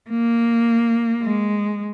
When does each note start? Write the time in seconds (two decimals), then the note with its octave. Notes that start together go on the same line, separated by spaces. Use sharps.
0.10 A#3
1.23 G#3